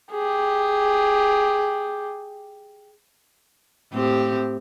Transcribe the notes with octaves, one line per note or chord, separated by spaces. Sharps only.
G4 G#4
A2 C4 G4